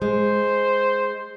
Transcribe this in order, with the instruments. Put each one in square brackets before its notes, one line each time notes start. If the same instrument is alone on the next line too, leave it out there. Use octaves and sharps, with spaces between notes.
[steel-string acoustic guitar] G#3 [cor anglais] C5